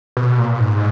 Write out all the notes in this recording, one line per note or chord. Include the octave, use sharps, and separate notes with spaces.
B2
A#2
G#2